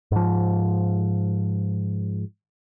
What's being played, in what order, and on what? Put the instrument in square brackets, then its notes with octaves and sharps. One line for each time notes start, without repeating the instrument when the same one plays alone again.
[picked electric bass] G#2 F3